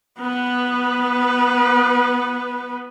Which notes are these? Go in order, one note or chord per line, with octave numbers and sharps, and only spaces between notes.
B3 B4